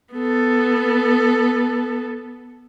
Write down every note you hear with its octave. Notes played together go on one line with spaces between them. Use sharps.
B3 A4